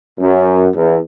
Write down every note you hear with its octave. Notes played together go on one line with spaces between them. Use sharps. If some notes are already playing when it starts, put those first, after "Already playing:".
F#2
E2